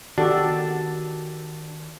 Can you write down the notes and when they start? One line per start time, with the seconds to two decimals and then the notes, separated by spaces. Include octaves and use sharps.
0.18 D#3 D4 F#4 G4 A4